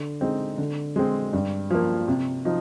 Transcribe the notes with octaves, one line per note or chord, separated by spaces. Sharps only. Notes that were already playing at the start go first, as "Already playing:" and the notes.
Already playing: D3
G#3 C4 D#4
D3
G#3 C4
G2
F3 A#3
C3
F3 D#4